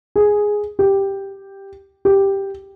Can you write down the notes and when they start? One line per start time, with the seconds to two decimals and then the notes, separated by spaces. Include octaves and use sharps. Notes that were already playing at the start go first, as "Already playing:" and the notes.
0.16 G#4
0.79 G4
2.05 G4